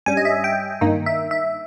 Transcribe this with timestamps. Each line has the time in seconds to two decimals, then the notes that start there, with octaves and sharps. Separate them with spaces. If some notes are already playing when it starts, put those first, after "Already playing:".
0.06 G2 G3 C#4 G#5
0.17 D#5
0.25 E5
0.44 G5
0.81 G2 D#3 A#3 D#4
1.06 E5
1.31 E5